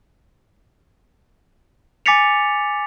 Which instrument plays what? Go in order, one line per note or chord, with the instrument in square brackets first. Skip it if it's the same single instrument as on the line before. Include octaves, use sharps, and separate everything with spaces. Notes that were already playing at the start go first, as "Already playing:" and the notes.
[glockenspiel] G#5 D6 A6 B6 C#7 F7